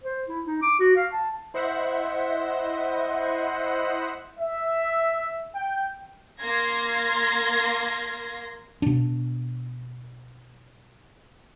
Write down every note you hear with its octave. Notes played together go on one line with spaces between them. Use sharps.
C5
E4
D#4
D6
F#4
F5
A5
E4 C5 D#5 E5 F#5
E5
G5
A#3 F5 C6 G#6 A#6
B2 D4